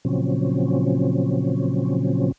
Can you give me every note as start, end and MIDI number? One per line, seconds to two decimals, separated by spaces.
0.05 2.32 46
0.05 2.32 49
0.05 2.32 53
0.05 2.32 54
0.05 2.32 60
0.05 2.32 61